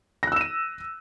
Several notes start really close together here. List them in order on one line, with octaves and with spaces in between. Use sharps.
A#6 F#6 E6 E7 D#7